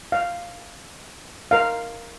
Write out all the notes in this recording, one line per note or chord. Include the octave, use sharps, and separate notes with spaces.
F5
A#4 F5